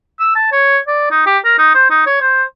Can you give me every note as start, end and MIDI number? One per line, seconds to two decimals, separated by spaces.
0.20 0.31 88
0.35 0.50 81
0.52 0.78 73
0.87 1.08 74
1.11 1.25 63
1.26 1.38 67
1.45 1.57 70
1.58 1.73 63
1.74 1.87 72
1.90 2.04 63
2.06 2.19 73
2.21 2.43 72